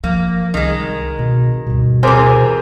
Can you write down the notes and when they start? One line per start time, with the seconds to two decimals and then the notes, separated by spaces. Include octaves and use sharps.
0.04 F3 A#3
0.54 C2 D#3 G#3
1.19 B2 C4
1.67 G1 D2 B2
2.03 C3 E3 G#4 A#4 C5